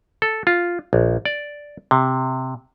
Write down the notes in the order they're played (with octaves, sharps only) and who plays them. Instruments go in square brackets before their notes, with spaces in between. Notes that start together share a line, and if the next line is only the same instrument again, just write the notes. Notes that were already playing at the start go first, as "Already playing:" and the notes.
[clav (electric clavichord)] A4
F4
A#1
D5
C3